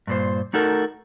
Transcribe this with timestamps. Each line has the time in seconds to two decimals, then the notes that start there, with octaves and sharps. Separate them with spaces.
0.07 G2 A#2 C5
0.53 A3 D#4 F#4 A4 A#4